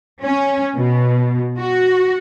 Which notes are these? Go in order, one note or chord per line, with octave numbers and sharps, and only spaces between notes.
C#4
B2
F#4